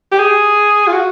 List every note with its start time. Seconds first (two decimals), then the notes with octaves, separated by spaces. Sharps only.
0.12 G4
0.19 G#4
0.88 F4
0.93 F#4